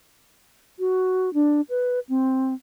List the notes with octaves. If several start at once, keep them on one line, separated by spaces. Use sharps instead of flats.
F#4
D4
B4
C4